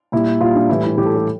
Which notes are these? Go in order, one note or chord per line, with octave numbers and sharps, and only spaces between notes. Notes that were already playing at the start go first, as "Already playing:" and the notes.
A#2 G3 E4
A#2 G3 F4
D4
A2 E3 G3 E4
E4
A2 E3 G3 G4
A4
G4